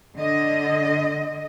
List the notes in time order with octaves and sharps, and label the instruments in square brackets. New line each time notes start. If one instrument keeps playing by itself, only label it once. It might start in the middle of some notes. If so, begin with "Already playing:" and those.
[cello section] D3 D#5